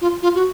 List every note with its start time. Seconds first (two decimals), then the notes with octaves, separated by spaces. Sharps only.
0.01 F4
0.22 F4
0.35 F#4